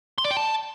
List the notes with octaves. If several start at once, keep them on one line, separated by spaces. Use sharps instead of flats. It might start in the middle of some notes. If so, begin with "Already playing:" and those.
C6
D5
G5
A5